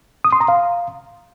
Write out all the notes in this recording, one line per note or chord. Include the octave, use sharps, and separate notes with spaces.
D#6
C6
A#5
F5